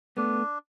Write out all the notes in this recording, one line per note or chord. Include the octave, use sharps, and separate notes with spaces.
A3 B3 D4